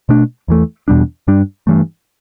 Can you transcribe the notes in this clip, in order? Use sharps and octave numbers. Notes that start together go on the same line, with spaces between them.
B2 A3 D4
E2 E3 A3
E2 B2 G3 D4
G2 G3 D4
G2 E3 A3